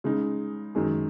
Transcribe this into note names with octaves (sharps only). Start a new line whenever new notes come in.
C#3 G#3 D#4
F#2 D#3 G#3 D#4 G#4